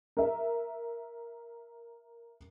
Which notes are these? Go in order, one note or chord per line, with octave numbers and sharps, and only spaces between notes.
A#4 E5